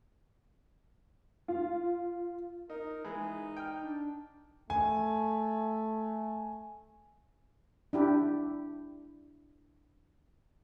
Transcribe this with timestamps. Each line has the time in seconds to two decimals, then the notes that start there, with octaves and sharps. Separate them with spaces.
1.48 F4
2.70 D#4 A#4
3.05 E3 G#3 D#4
3.57 G5 F6
3.83 D4
4.70 A3 G#5
7.93 D4 E4 G4